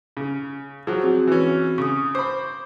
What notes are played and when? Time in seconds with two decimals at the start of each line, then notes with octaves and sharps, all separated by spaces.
0.17 C#3
0.87 F3 F#3 G#4
1.02 C4 F#4
1.27 E3 C#4
1.78 C#3 C#6 D#6
2.15 C5 B5 D6